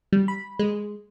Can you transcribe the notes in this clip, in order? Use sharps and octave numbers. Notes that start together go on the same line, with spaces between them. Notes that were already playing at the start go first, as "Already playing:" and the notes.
G3
B5
G#3